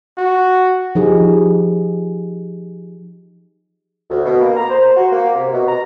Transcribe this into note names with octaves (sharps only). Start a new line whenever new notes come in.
F#4
F3 D#4 G4 G#4
D2
B2
A#3
A#5
C5
F#4
A#3
C3
B2
A#5